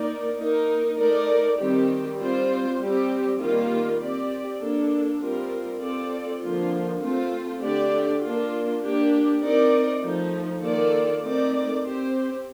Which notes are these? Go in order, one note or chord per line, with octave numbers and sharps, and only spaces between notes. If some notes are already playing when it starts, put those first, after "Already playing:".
Already playing: A#3 D#4 A#4 D5
A#3 D#4 A#4
A3 D#4 A#4 D5
D#3 G3 C4 G4
G3 C4 F4 C5
G3 C4 G4
D#3 G3 A#3 F4
C4 G4 D5
A#3 D4 A4
G3 C4 F4 A#4
C4 F4 A4 D5
D3 F3 A#3 F4
A3 C4 F4
D3 A3 D4 G4 D5
A#3 D4 F4
A#3 D4 G4
C4 D#4 A#4 D5
F3 A3 D#4
D#3 A#3 F4 A4 D5
A3 C4 D#4 A#4 D5
C4 G4 C5